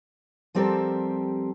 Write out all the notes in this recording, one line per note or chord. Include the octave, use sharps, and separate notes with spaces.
F3 G3 C4 G4 A4 A#4